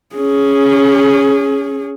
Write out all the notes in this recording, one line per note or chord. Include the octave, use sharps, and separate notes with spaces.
C#4 G#4